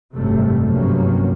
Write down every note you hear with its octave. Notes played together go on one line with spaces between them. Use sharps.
G#1 F#2 C3 G3 A3
C2 G2 F3 F#3 A#3 C#4